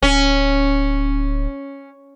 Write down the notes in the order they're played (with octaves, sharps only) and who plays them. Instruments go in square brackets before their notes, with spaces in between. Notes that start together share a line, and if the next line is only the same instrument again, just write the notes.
[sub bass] D1 [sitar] C#4